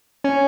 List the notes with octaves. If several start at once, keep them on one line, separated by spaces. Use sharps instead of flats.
C#4